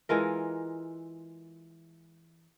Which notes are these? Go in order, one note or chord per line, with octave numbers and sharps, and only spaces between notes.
E3 G#3 F4 A#4